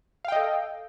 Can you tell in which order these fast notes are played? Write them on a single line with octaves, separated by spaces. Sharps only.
F5 G5 D#5 A4